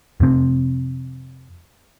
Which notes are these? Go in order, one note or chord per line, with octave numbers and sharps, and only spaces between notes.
F2 C3 C4